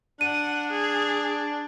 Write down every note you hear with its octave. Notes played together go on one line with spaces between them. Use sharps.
D4 F#5 D#7
G#4